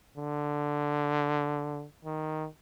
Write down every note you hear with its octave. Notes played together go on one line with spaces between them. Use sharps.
D3
D#3